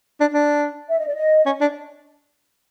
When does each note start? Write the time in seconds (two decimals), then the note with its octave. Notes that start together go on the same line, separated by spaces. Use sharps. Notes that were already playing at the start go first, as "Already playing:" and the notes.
0.20 D4
0.34 D4
0.90 E5
0.99 D#5
1.07 D5
1.15 D#5
1.46 C#4
1.61 D4